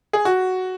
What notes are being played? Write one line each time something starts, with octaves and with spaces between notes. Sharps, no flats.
G#4
F#4